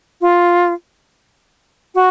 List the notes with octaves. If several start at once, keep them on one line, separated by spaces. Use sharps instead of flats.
F4
F#4